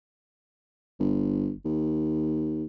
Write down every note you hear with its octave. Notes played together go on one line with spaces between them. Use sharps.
G1
D#2